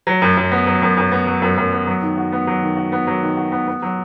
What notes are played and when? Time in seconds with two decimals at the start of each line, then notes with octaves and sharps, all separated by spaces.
0.07 F#3
0.22 F#2
0.37 F#2
0.52 B3
0.67 F#3
0.82 F#2
0.97 F#2
1.12 B3
1.27 F#3
1.42 F#2
1.57 F#2
1.73 B3
1.87 F#3
2.02 D#3
2.17 F#4
2.32 B3
2.47 F#3
2.62 D#3
2.77 F#4
2.92 B3
3.07 F#3
3.22 D#3
3.37 F#4
3.52 B3
3.67 B3
3.82 F#3